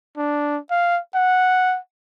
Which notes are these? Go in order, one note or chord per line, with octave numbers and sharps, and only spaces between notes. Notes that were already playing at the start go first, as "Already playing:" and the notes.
D4
F5
F#5